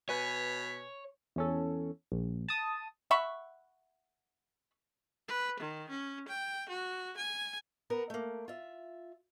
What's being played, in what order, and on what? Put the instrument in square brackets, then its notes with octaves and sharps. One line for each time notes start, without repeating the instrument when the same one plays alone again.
[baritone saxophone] B2 [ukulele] B4 G#5 [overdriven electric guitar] C#5 [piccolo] B6
[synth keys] E2 C#4 A4
A#1
A5 D#6
[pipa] E5 F#5 B5 C#6
[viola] B4
D#3
C#4
G5
F#4
G#5
[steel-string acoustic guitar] B3 A#4 A#5
A3 A#3
F4 E5